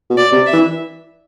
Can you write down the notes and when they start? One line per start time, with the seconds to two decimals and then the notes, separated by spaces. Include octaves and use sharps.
0.10 B2
0.18 D5
0.32 C3
0.46 E5
0.53 E3